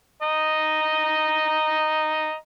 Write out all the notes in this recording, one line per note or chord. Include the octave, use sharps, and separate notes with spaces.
D#5 A#5